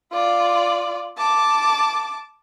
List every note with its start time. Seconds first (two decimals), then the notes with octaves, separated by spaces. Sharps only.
0.12 F4 D5
1.18 A5 D6